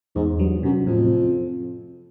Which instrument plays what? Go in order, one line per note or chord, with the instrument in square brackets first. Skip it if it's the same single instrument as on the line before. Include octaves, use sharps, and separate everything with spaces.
[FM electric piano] E2 [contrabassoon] G#2
[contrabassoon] G2 [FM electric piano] F#3
[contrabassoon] F#2 [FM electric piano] C3
[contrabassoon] F2 [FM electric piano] A2